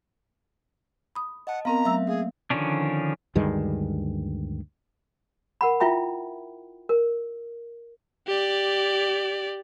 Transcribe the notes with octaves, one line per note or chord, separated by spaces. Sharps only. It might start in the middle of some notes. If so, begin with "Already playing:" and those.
B5 D#6
D#5 F#5 A5
B3 C4 A#4 F5 A#5
F#3 A3 E5 E6
A#3 G#4 F5
D3 D#3 F3 C#4 D4
D2 G2 D#3 G#3
A#4 F#5 B5
E4 F4 E5 G5 B5
A#4
G4 D5